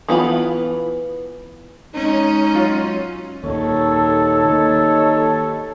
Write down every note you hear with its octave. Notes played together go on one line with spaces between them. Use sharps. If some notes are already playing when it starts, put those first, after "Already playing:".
E3 B3 F4 B5
G#3 C#4 D#4
F#3 F4
D#2 A#2 D#4 A4 C#5
D#3 A#3